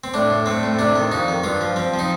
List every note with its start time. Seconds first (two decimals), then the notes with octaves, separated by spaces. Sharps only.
0.04 C4
0.14 A2 D4
0.30 A2
0.46 A3 C4
0.63 A2
0.79 C3 D4
0.95 D#3
1.12 F2 D#4
1.28 D#3
1.44 G2 F4
1.61 F3
1.76 F3 C4
1.94 F3
1.99 D#4